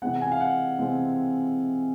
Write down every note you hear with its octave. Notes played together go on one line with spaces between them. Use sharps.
C3 E3 G#3 C4 F#5
G#5
F5
F#5
C3 E3 G#3 C4